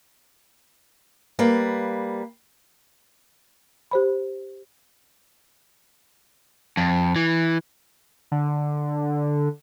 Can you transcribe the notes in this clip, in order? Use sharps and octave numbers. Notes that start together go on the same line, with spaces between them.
G3 A#3 B4
G4 C5 B5
F2
E3
D3